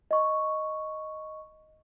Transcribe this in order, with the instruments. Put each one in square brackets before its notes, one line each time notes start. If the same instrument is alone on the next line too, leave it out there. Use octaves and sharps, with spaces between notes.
[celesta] D#5 C#6